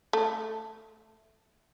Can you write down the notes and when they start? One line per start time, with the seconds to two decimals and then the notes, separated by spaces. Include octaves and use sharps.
0.13 A3